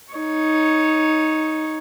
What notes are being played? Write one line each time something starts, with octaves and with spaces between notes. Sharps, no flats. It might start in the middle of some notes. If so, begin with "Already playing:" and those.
D#4 C#5